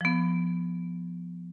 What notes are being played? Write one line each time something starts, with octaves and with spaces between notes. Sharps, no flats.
F3 B3